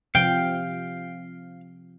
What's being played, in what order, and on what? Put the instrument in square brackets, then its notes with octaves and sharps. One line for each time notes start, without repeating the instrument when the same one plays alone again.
[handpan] C3 F3 [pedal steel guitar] F5 [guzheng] G5